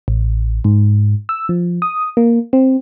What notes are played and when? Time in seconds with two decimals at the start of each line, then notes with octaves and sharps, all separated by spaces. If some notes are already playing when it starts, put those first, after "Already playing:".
0.08 A1
0.64 G#2
1.29 E6
1.49 F3
1.82 D#6
2.17 A#3
2.53 C4